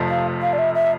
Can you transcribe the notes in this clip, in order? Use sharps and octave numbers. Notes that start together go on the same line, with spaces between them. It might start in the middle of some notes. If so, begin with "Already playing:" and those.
Already playing: F1 F2 C3 F3 A3
F5
F5
D5
E5
E5